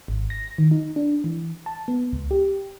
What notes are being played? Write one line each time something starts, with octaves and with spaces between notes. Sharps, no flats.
G#1
A#6
D#3
D#4
D4
E3
A5
B3
C#2
G4